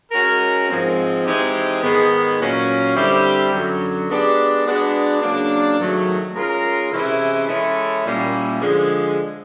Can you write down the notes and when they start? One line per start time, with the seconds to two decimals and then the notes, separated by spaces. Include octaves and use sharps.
0.12 G#3 C#4 F#4 A#4
0.68 G#2 F3 G#3 C4
1.25 E3 G#3 C4 D#4 G4
1.82 G#2 D#3 G#3 B3
2.39 A#2 F#3 A#3 C#4
2.94 D3 G3 C4 E4 G4
3.51 F#2 D3 F#3
4.08 G#3 B3 D4 G4
4.64 G#3 B3 D4 F#4
5.21 C#3 F#3 A#3 D4
5.78 G#2 D#3 F#3 A3
6.34 G#3 C#4 F4 A#4
6.91 C3 E3 G#3 C#4 E4
7.47 E3 G#3 C#4 E4 A4
8.04 A#2 G3 A#3 C#4 E4
8.61 D3 F3 G#3